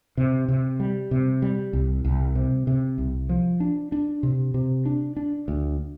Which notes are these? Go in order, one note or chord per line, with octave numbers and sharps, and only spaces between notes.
C3
C3
G3
C3
G3
C2
C2
C3
C3
C2
F3
D4
D4
C3
C3
D4
D4
D2